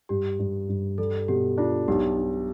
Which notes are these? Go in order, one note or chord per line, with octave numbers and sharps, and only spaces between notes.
G2 G4
G2
G2
G3 A4
B2 G4
D4 F4
B1 G4
D4